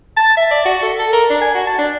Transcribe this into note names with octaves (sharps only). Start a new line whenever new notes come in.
A5
E5
D5
F#4
A4
A4
A#4
D4
G#5
F#4
A5
D4